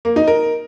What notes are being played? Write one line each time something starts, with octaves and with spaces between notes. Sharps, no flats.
A#3
D#4
A#4